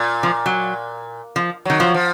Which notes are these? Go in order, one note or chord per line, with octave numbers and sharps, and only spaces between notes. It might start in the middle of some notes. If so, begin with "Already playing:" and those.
Already playing: A#2
F3
F#3
F3
D#3 F#3
F3
F3